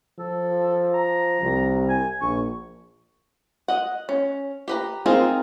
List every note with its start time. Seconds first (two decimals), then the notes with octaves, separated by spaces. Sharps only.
0.19 F3 A4
0.94 A#5
1.42 C2
1.89 G#5
2.21 A#1 C#6
3.68 D#5 F#5
4.09 C#4
4.68 G4 B4 A#5
5.06 C4 D#4 F4 G#4 A#4